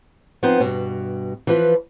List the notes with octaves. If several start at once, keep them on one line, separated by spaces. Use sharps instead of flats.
F3 B3 C4 D#4 B4 C5
G2 B2
E3 F3 F4 B4